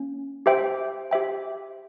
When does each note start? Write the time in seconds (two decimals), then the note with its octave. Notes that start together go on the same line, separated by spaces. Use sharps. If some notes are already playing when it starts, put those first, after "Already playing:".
Already playing: A#3 C#4
0.46 G4 C5 E5 G5
1.11 G4 C5 E5 G5